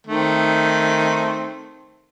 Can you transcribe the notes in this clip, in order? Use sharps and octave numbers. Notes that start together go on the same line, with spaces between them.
D#3 A3 C4